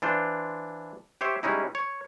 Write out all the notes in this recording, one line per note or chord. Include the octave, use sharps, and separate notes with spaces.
E3 D4 F4 C5
G4 C5 C#5 E5
G3 G#3 C#4 D#4 E4
C#5